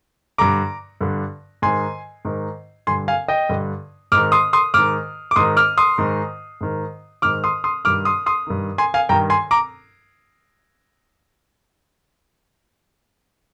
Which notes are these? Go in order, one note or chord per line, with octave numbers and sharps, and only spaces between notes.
G2 D3 A#5 D6
G2 D3
G#2 D#3 G#5 C6
G#2 D#3
G2 D3 G#5 C6
F5 G#5
D#5 G5
G2 D3
G#2 D#3 D6 F6
C6 D#6
C6 D#6
G#2 D#3 D6 F6
D6
G#2 D#3 C6 D#6
D6 F6
C6 D#6
G#2 D#3
G#2 D#3
G#2 D#3 D6 F6
C6 D#6
C6 D#6
G2 D#3 D6 F6
C6 D#6
C6 D#6
G2 D#3
G#5 C6
F5 G#5
G2 D#3 G5 A#5
G#5 C6
A#5 D6